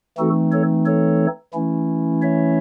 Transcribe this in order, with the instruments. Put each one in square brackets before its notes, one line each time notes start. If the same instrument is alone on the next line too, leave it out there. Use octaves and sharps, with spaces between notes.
[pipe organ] E3 A3 C4 D#4 F#4 A4
A4 C#5
A4 C#5
E3 A3 C#4 E4
C#5 E5